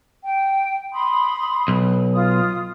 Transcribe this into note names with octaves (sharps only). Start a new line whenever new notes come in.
G5
B5 C6 D#6
B1
F4 D#6